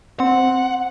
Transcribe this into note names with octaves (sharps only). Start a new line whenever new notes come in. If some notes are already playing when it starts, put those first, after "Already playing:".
C4 F#5